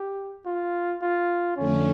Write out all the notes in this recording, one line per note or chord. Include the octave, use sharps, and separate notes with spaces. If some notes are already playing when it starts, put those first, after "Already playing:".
Already playing: G4
F4
F4
F2 D3 A3 C#4